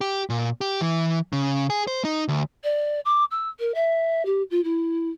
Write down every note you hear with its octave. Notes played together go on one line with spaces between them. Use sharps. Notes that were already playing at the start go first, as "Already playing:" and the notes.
G4
A#2
G4
E3
C#3
G#4
C5
D#4
D2
D5
D6
E6
A#4
E5
G4
F4
E4